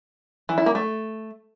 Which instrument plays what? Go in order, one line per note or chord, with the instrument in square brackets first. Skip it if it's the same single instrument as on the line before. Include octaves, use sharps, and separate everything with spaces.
[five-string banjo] E3
E4
A#3
A3